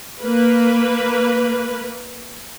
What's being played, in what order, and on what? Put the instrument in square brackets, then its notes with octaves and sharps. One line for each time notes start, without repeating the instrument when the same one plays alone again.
[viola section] A#3 B4